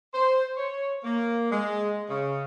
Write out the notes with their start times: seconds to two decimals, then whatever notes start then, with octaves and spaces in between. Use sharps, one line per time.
0.14 C5
0.57 C#5
1.04 A#3
1.50 G#3
2.09 C#3